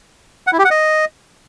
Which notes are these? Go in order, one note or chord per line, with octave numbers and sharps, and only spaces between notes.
F#5
E4
G4
F#5
D#5